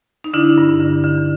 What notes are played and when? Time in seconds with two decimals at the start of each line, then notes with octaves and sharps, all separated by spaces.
0.24 D#4
0.34 D3 D4 E4
0.58 G2
0.80 D3
1.04 D3